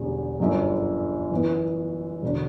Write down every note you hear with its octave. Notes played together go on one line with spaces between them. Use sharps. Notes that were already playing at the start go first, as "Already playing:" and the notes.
Already playing: E1 E2 D3 G3 C#4
G1 F#2 D3 F#3
F#2 E3 B3
E1 D3